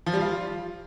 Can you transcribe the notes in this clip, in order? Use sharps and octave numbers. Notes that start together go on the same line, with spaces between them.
F3
G3
F4